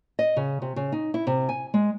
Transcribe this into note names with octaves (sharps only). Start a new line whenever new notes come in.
D#5
C#3
C3
C#3
D#4
E4
C3
G#5
G#3